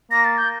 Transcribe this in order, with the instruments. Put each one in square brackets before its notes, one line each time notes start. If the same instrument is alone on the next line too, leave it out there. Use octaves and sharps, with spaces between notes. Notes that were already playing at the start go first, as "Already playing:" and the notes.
[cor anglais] A#3 [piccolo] A#6
[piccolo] A6
G6